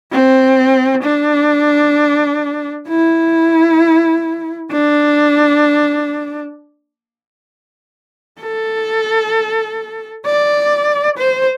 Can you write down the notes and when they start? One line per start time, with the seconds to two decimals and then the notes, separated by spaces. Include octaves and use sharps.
0.12 C4
1.04 D4
2.88 E4
4.73 D4
8.42 A4
10.26 D5
11.18 C5